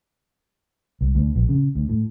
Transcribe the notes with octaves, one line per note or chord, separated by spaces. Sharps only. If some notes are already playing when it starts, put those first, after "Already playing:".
C2
D2
A#1
C#3
D2
A2